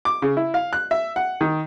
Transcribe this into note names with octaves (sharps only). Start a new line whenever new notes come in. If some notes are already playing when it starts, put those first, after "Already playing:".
D6
C#3
E4
F5
F#6
E5
F#5
D#3